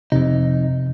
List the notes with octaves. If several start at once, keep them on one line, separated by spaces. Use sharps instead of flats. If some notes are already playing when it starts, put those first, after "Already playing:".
F2 C3 D#4